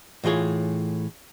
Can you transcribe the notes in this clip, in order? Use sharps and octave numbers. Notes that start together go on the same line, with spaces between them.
A2 E3 F4 G#4 C#5